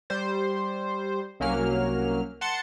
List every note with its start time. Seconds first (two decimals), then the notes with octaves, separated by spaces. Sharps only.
0.10 G3 C5
1.40 C2 F#3 A#3 C#4 F6
2.41 F#5 A5 C6 A6 C#7